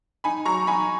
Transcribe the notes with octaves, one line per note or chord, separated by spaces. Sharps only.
D#4 G#5 B5
F#3 A#5 C#6
D#4 G#5 B5